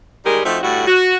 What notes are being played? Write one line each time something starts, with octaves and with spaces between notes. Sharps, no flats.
D#3 G3 G#3 G4 A#4
F3 A3 C4 D#4 F#4
A2 D3 G3 E4 F#4
F#4